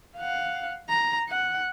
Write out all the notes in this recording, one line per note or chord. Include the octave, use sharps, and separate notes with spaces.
F5 F#5
A#5
F#5